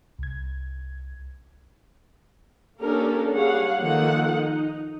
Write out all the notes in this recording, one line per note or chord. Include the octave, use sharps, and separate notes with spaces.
C2 G#6
A#3 C#4 D4 G4 A4 A#4
G3 G#4 C#5 F5 F#5
D#3 F3 A#3 A4 F#5
D#4